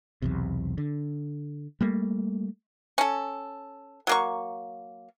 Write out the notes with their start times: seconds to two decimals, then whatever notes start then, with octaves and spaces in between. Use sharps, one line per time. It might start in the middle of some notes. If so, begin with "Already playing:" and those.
0.22 B1 E2 C3
0.78 D3
1.81 G3 A3 A#3
2.98 C#4 A4
4.07 F#3 A#3 C#6